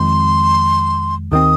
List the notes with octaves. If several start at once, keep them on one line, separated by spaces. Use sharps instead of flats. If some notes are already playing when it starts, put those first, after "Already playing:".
Already playing: F2 D#3 G#3 C4 C6
D#2 D#3 C4 D#6